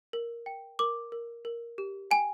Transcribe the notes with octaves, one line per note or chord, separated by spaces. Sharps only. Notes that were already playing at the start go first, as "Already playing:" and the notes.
A#4
G5
A#4 D6
A#4
A#4
G4
G5 G#5